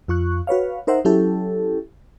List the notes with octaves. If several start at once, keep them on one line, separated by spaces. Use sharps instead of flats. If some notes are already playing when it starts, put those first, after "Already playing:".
F2 F4 C#6 F#6
F#4 B4 C#5 F5
D#4 A#4 C5 E5 F#5
F#3 C#4 E4 G4 A4